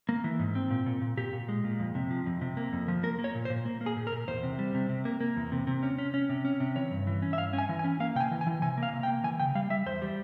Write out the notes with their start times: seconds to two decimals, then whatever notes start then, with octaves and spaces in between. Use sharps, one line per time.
0.09 A#3
0.24 E3
0.39 G#2
0.55 C4
0.71 A#2
0.86 A#2
1.02 A#2
1.17 A#2 G4
1.33 A#2
1.48 G#3
1.64 A#2
1.80 F2
1.95 C3
2.10 F3
2.26 F2
2.41 C3
2.57 A#3
2.73 F2
2.88 F3
3.03 A#3 A#4
3.19 A#3
3.24 C#5
3.35 A#2
3.45 C5
3.50 A#2
3.65 A#3
3.81 A#3
3.86 G#4
3.97 A#2
4.07 A#4
4.12 A#2
4.28 E2 C5
4.43 C3
4.59 G3
4.74 C3
4.89 C3
5.05 A#3
5.20 A#3
5.36 E2
5.52 C3
5.67 C3
5.83 C#4
5.98 C#4
6.14 C#4
6.29 C3
6.45 C#4
6.60 C3
6.76 E3 C#5
6.91 G2
7.07 E3
7.22 C#4
7.33 E5
7.38 G2 F5
7.53 C#4
7.58 G#5
7.69 E3
7.79 G#5
7.84 C#4
8.00 A#3 F5
8.15 C3 G5
8.20 G#5
8.31 E3
8.41 G#5
8.47 E3
8.62 C3 G#5
8.77 A#3
8.83 F5
8.93 C3
9.03 G5
9.08 A#3
9.24 E3 G#5
9.40 C#3 G5
9.55 G3 F5
9.70 G3 E5
9.86 E2 C5
10.02 G3